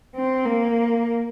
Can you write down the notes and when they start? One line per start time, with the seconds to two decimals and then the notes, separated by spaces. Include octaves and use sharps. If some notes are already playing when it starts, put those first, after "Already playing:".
0.16 C4
0.45 A#3